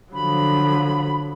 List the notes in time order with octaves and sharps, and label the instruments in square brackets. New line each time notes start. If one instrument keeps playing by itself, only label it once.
[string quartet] D3 F3 F#3 [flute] B5